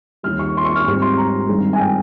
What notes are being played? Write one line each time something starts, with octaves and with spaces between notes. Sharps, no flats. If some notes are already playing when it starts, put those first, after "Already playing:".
D#2 D#3 G3 F6
C#6
C6
C#6
F6
G#1 G#2 G3 C4 D#4 C#6
C6
A#5
G2 D#3 G#3 C4
G#5
G5